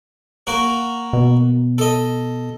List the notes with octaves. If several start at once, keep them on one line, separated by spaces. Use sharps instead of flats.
A#3 F#4 A#4
B2
A4 D#5